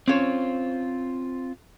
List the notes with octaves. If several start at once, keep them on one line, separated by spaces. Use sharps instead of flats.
C4 C#4 F4 C5 C#5